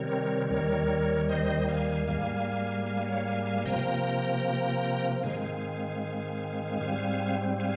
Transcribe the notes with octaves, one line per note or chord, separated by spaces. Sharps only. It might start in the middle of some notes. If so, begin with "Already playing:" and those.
Already playing: C3 D#3 G3 C4 A#4 C#5
D#2 D#3 G3 A#4 C#5
C5 D#5
F5 G#5
G#2 G3 A#3 F5 G#5
F5 G#5
C#5 F5
F5 G#5
F5 G#5
C3 F3 A#3 G5 A#5
G#2 D#3 G#3 C4 F5 G#5
G#2 G3 C4
F5 G#5